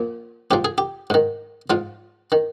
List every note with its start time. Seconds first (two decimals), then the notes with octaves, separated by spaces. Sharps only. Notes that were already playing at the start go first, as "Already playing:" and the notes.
Already playing: A#2 F3
0.51 G#2 F3 G4
0.65 G#4
0.78 G4
1.10 G#2 D#3
1.70 G#2 F3 F4
2.32 D#3